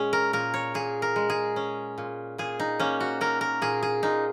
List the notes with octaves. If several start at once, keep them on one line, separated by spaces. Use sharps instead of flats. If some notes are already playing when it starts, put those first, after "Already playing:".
Already playing: A#2 G#3 C#4 G#4
A#4
A#2 A#4
C#5
A#2 G#4
A#4
G#3
G#4
C#4
A#2
A#2 G#4
D#4
A#3 C#4
F#4
C#4 A#4
A#4
A#2 G#4
G#4
A#2 D#4